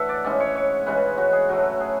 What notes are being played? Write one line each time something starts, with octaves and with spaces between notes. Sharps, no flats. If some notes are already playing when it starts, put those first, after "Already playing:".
Already playing: E3 A3 D4 E5 F#5
D5
G#2 G#3 C#4 E4 D5
C#5
C#5
C#3 E3 G#3 C#4 B4
F#4
G#4
A2 F#3 A3 F#4
G#4